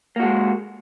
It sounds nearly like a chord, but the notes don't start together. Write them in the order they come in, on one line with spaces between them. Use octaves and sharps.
A#3 F#4 G#3